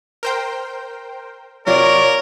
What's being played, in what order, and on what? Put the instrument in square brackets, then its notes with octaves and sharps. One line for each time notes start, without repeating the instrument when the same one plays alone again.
[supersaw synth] A#4 C5 G5
[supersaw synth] C3 F#3 F4 [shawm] A#4 [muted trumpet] C#5 [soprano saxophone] D5